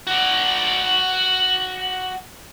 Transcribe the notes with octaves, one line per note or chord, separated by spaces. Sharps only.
F#4 D5